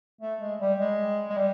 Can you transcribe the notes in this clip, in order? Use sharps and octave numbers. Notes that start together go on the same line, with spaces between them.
A3
G#3
G3
G#3
G#3
G3